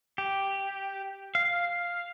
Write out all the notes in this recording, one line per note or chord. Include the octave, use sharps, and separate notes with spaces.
G4
F5